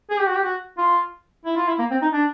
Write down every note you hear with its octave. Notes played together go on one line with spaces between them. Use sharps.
G#4
G4
F#4
G4
F#4
F4
E4
F4
E4
A#3
C4
D#4
D4